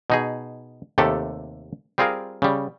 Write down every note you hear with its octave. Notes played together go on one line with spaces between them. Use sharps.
B2 D#4 G#4
D#2 C3 A3 G4 A4 A5
G3 C4 F4 G#4 A#4 F5
C#3 G3